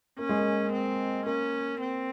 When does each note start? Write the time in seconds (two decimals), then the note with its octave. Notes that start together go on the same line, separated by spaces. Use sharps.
0.19 A#3 C#4
0.29 G#3
0.39 A#3
0.73 C4
1.26 A#3 C#4
1.80 C4